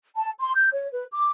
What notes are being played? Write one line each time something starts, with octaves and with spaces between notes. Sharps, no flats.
A5
C6
G6
C#5
B4
D6